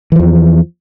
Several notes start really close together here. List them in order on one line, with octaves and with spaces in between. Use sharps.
E3 F3 E2